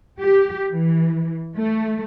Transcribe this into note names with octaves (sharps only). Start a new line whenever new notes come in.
G4
E3
A3